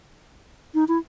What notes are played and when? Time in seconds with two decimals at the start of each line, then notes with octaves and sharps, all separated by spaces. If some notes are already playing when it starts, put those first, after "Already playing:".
0.74 D#4
0.88 E4